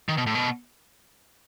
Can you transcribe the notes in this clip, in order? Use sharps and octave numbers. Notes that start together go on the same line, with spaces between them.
D#3
B2
A2
B2